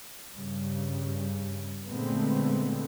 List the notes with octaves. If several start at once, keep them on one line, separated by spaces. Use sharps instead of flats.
G2 C#3 G3
A#2 D3 G#3 A3 B3 C4